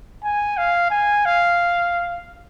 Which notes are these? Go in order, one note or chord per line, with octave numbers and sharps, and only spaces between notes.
G#5
F5
G#5
F5